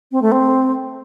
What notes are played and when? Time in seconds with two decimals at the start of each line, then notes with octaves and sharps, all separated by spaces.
0.12 C4
0.22 A3
0.32 C4